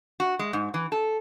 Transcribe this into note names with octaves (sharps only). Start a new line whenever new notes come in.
F#4
G#3
G#2
E3
A4